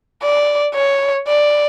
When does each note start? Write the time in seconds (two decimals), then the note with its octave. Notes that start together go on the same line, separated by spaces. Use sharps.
0.23 D5
0.75 C#5
1.28 D5